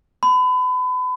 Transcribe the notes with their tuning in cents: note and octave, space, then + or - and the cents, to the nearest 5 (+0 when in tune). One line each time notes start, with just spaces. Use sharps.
B5 +35